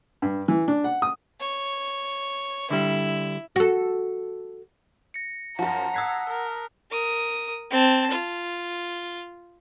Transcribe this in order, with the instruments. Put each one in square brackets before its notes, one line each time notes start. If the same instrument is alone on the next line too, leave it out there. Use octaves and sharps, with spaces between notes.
[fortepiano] G2
E3
D4
F#5
D#6
[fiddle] C#5
[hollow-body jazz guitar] D3 G3 [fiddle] E4
[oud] F#4 A4
[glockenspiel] A#6 C#7
[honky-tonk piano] F#2 F3 [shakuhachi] F#5 [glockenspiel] A5 [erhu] A#5
[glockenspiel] D#6 F#6 B6 [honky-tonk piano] E6 G#6 C7
[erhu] A#4
[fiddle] A#4 D#6
C4 A5
F4